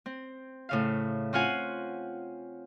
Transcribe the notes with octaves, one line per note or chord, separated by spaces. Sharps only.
C4
A2 C#3 F5
C4 C#4 F4 F5 F#5 G#5